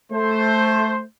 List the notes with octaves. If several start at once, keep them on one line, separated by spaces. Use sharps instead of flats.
A3 C5